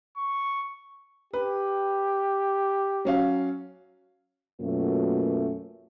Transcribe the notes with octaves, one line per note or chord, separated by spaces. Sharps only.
C#6
G4 B4
F#3 C#4 F5
F#2 B2 F#3 A3 A#3 F4